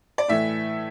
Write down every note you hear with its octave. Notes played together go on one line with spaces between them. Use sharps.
D5
A2 E3 A3 E5